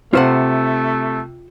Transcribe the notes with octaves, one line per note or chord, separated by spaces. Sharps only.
C3 A3 F4 C5 F#5